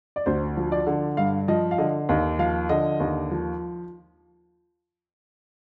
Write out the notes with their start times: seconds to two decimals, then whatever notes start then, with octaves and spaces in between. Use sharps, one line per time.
0.16 D5
0.26 D2 C5
0.57 F3
0.72 D5
0.87 D3
1.17 G2 F5
1.48 F3 D#5
1.71 F5
1.78 D3 D#5
2.09 D#2 D#5
2.39 F3 F5
2.69 D3 D#5
3.00 D#2
3.31 F3